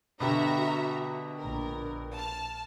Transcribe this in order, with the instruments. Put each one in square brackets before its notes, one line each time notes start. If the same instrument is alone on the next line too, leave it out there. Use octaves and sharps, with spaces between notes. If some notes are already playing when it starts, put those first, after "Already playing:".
[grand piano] B2 D3 G4 [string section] F#4 E5 A#5
[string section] A#1 A#4
A5 F6